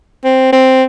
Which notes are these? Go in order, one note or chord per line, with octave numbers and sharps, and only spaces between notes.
C4
C4